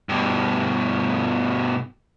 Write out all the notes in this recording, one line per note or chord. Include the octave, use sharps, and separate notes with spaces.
G2 B2